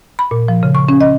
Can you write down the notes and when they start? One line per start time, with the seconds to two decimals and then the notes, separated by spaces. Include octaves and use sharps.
0.19 B5
0.31 A#2
0.48 F3
0.63 C#3
0.75 C#6
0.89 C#4
1.01 D#5